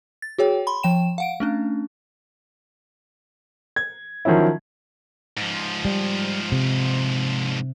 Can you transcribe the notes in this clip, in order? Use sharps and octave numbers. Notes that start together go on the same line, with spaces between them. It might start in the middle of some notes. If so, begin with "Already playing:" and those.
A6
F#4 G#4 C#5 G5
B5 C6
F3 G5 E7
F5 F#5 D7
A3 C#4 D4
G#6
D#3 F3 F#3 C#4 E4
G#2 F3
G3
C3